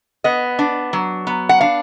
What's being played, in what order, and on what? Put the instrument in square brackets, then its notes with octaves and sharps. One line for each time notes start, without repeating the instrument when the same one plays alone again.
[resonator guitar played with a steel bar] B3 D#5
D4
F#3
B3
F#5
D4 F5